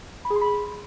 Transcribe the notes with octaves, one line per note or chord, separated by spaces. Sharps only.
B5
G#4
C6
B5